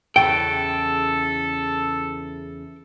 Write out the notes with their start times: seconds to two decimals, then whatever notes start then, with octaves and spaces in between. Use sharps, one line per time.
0.16 E2 C#3 E3 A4 G5